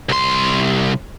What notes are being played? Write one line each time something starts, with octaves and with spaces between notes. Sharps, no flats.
C2 C6